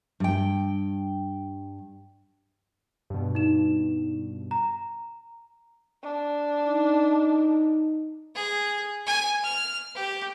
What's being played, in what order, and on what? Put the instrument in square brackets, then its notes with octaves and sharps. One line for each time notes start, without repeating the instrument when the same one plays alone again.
[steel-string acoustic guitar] G2 G5
[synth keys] G2 B2
[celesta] D#4 E7
A#5
[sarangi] D4
[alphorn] D#4
[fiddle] G#4
G#5
F6
G4